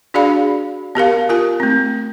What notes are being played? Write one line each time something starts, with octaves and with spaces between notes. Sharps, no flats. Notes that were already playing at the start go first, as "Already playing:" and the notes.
D4 F#4 G#4 D5 F5 B5
B3 G4 A#4 F5
F4 A#4 G#5
A3 C4